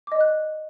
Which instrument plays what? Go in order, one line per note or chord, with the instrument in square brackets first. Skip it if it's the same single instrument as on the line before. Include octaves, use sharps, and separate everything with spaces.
[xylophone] D6
D#5
D5
F#6